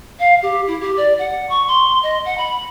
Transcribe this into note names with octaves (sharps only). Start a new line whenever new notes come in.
F5
G4
E4
G4
D5
F#5
C#6
C6
D#5
F#5
B5